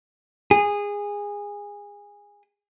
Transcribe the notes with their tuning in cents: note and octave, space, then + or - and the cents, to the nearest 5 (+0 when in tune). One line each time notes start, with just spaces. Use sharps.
G#4 -20